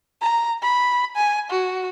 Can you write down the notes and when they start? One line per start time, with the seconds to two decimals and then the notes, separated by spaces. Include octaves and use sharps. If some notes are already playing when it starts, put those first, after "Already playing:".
0.21 A#5
0.63 B5
1.16 G#5
1.50 F#4